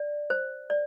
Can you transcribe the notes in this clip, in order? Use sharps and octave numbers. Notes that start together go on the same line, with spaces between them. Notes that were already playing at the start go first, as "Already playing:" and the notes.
Already playing: D5
C5
D5